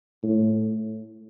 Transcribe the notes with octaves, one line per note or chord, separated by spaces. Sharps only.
A2